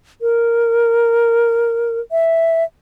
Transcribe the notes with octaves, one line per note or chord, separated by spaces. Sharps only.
A#4
E5